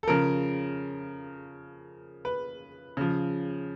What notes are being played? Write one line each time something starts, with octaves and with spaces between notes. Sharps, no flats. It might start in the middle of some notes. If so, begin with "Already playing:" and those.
A4
C#3 F3 A#4
B4
C#3 F3